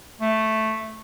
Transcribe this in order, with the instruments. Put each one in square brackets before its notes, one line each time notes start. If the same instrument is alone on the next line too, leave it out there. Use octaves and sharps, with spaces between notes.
[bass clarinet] A3